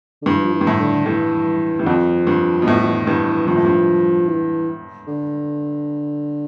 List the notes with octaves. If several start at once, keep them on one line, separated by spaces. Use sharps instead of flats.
D3
G2 E3
F3
E3
G2
A2
D3
G2 E3
G2 E3
F2 F3
G2
B2
A2 F3
F3
E3
G2 E3
E3
G2 F3
A2
G2
E3
D3